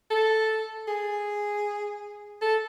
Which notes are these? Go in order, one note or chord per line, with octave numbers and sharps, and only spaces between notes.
A4
G#4
A4